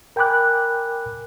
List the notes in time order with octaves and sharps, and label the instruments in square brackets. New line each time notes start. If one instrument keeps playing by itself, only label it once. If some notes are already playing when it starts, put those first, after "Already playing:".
[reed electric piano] A#4 G5 G#5 B5 D6 F#6